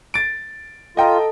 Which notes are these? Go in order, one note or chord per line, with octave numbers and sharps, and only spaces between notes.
A6 D7
F4 A4 D#5 G5 A#5